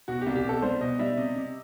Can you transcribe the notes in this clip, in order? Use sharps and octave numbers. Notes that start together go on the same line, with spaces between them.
B2 F#4
C2 G4
G4
B2 A4
G3 C5
B2 D#5
G3 E5
C3 D#5
C3